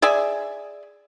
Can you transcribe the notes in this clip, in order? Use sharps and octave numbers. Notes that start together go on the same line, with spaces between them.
G#4 D5 E5 G#5